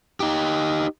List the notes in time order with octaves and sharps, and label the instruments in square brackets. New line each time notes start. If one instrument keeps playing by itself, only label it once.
[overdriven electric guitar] D#4 G4